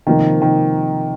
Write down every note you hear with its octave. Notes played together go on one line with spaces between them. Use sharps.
C3 D#3 F3 A#3 D#4
D#3